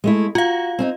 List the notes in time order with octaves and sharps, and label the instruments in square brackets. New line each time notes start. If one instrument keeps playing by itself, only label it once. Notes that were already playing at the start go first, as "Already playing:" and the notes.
[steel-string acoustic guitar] G#3 A3 E4
[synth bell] F4 F5 [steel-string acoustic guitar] F#4
[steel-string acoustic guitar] C4 C#4 D#4